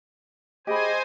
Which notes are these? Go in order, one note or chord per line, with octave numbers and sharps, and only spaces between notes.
G4 G#4 C5 D#5 G#5 B5